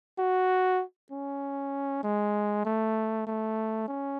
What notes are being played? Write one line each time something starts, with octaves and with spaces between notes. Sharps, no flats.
F#4
C#4
G#3
A3
A3
C#4